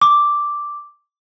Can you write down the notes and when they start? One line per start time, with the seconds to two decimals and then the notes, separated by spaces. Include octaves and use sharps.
0.02 D6